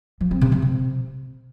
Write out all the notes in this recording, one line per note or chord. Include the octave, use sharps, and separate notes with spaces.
F3
C4
C3
C3
C3